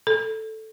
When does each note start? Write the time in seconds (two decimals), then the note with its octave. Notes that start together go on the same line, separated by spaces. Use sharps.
0.07 A4